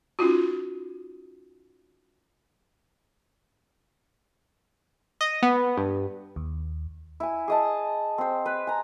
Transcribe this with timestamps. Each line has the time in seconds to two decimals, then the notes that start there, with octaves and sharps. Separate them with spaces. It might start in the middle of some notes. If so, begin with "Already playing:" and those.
0.19 C#4 D#4 F4 F#4
5.21 D#5
5.42 B3
5.77 G2
6.36 D#2
7.20 E4 G#5
7.48 G#4 D#5 A5
8.18 C4 C5
8.46 B4
8.67 G#5 A#5